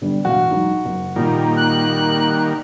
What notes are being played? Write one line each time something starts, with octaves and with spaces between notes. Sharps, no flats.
D3 G3 B3
E1 A2 F#4 F5
F#3 G#3 D#4
F#1
A#2 D#3 G3 A#3
F#6